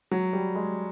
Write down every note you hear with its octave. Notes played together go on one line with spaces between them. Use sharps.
F#3
G3
G#3